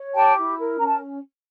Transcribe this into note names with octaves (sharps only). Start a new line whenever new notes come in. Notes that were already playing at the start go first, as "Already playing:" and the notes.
Already playing: C#5
G4 G5 A5
E4
A#4
C#4 A#5
A5